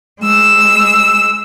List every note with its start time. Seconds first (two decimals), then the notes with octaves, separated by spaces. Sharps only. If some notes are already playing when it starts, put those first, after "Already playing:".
0.21 G#3 E6